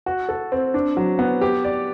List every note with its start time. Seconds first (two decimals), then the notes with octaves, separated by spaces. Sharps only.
0.06 F#4
0.29 A4
0.52 C4
0.74 D4
0.97 F#3
1.19 B3
1.41 G4
1.64 D5